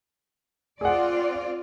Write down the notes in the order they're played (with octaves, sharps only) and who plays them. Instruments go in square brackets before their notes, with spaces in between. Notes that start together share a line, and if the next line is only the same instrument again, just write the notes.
[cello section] C4 F4 D5 [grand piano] G#4 F#5